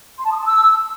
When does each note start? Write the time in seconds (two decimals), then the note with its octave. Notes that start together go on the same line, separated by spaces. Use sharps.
0.18 C6
0.25 A5
0.32 D#6
0.39 A5
0.46 E6